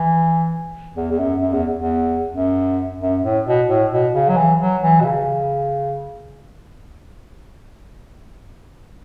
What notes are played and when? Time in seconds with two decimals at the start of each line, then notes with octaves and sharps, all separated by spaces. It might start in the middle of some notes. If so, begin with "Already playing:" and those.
Already playing: E3
0.96 E2
1.11 E2
1.19 F#2
1.41 F#2
1.53 E2
1.77 E2
2.32 F#2
3.00 F#2
3.23 A2
3.46 B2
3.69 A2
3.91 B2
4.14 C#3
4.29 F#3
4.37 E3
4.60 F#3
4.82 E3
5.01 B2
5.05 C#3